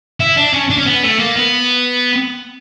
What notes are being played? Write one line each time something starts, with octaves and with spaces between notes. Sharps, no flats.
E4
D4
C#4
D4
C#4
B3
A3
A#3
B3